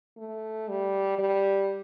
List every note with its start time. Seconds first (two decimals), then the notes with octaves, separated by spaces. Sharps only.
0.18 A3
0.68 G3
1.18 G3